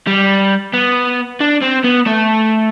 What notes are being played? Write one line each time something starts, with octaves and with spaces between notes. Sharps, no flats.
G3
B3
D4
C4
B3
A3